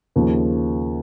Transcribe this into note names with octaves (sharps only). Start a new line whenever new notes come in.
D#2 C#3 F3